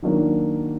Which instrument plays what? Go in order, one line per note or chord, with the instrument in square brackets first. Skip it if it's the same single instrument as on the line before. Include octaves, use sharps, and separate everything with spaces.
[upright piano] D#3 F#3 A#3 D4 F#4